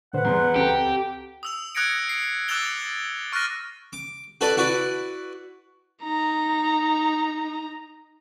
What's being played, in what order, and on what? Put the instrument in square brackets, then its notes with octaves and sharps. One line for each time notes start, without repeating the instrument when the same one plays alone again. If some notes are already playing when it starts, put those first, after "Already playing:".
[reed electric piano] A2 D3 C5 [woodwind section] B4 F#5
[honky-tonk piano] E2 [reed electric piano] G3 G#4 C6
[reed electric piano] C#2 [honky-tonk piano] C4 A4 A#5 [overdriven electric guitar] G4
[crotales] D#6 E6 F7
D#6 F#6 G#6 A#6 C#7 D7
C7
D6 E6 F#6 A6 F7 G7
C#6 F6 F#6 A6 A#6 D#7
[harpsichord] D6
F#4 A4 B4 D5
E4 F#4 B4 D5
[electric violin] D#4 A#5